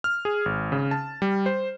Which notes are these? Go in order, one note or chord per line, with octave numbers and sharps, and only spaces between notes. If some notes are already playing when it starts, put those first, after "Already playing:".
F6
G#4
G#1
C#3
A5
G3
C5